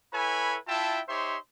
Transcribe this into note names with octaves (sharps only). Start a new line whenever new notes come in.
E4 A4 B4 C#5 G#5 B5
E4 F4 E5 G5 A5
D#4 G4 C5 C#5 E5 C6